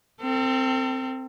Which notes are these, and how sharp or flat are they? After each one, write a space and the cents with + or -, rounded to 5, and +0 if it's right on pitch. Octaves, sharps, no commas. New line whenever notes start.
C4 +0 A4 +40